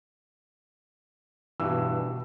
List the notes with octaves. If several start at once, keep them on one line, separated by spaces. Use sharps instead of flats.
G2 B2 E3 E6